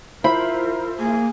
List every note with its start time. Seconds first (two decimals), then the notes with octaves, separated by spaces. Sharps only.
0.24 E4 F4 A#4 C5 B5
0.99 A#3 G#4